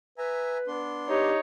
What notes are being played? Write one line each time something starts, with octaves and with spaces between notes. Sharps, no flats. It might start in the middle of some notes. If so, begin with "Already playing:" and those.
B4 E5 G#5 A#5
B3 D4 C6
D#4 G4 C#5